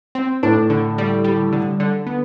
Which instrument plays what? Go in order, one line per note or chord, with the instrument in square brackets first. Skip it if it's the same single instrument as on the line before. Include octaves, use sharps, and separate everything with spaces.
[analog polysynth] C4
[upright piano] A2 [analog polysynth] D4
[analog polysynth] D3
G3
G3
D3
D3
B3